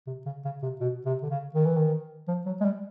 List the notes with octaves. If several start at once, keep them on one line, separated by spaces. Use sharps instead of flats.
C3
C#3
C#3
C3
B2
C3
D3
C#3
D#3
E3
D#3
F3
F#3
G#3
G3